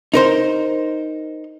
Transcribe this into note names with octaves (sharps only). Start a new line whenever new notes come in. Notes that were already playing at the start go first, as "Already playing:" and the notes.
D#4 A#4 C5